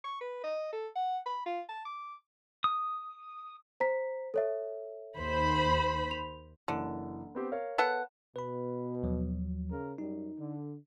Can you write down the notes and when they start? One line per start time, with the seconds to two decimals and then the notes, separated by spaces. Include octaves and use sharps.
0.04 C#6
0.21 B4
0.43 D#5
0.72 A4
0.95 F#5
1.26 B5
1.46 F4
1.69 A5
1.85 D6
2.64 D#6
3.80 C5 A#5 B6
4.34 A4 C#5 E5
5.16 D#2 C5 B5
6.11 F7
6.68 F#1 D3 E3
7.35 B3 C4 G4
7.52 A#4 C#5 F5
7.78 B3 A4 F#5
8.36 B2 B4 B5
9.03 D#2 F3 F#3
9.69 C#3 A#4
9.98 F#2 G3 D#4
10.37 D3